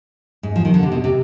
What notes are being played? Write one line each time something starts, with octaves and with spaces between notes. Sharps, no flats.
G#2
F3
D#3
D3
C3
B2
C3